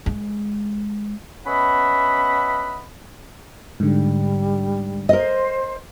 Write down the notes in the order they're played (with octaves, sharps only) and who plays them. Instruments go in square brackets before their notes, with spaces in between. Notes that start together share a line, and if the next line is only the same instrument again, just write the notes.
[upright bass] G#3
[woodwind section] B3 C#4 D#5 E5 F#5 B5
[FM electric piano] G#2 D3 [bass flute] G3
[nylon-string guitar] A#4 D#5 [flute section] C5